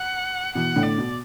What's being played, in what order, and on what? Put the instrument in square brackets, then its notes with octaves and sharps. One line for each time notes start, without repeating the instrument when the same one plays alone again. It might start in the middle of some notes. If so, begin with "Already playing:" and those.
Already playing: [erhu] F#5
[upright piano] B2 E3 [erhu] F#5
[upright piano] A2 D3
[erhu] D5
[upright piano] B2